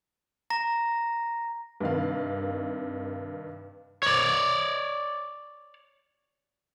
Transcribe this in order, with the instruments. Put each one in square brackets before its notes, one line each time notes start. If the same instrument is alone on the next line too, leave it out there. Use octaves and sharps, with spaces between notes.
[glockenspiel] A#5 A#6
[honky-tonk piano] G2 C3 D#3 F5
[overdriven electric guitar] C#5 D5